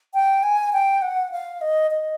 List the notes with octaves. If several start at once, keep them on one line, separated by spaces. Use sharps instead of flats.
G5
G#5
G5
F#5
F5
D#5
D#5